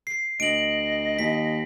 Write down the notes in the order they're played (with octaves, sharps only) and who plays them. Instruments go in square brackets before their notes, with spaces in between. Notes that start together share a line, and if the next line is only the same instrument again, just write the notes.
[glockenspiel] C7
[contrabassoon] D2 [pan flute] D#5 [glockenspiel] D7 F#7
[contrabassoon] D#2 [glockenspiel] B6